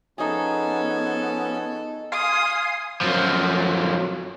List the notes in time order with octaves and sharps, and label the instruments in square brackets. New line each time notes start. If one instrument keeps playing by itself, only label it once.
[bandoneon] F3 C#4 G#5 [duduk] B3 [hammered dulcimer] D#4 G#4 [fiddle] A4
[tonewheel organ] F5 G#5 C6 [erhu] D#6
[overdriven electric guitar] F#2 F3